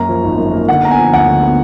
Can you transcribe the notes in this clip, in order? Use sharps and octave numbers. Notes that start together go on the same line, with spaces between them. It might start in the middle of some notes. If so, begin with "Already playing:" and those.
Already playing: F#2 A#3 A#5
F3
G#1
F#2
A#3
D3 F#5
B3 A#5
G#5
F3
D2 F#5
D3
B3